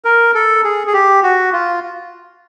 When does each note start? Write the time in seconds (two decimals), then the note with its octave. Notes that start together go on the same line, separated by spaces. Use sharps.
0.05 A#4
0.35 A4
0.64 G#4
0.87 G#4
0.93 G4
1.23 F#4
1.53 F4